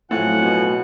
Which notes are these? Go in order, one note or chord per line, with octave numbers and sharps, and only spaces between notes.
F2 A2 F#3 F4 F#5 G#5
B2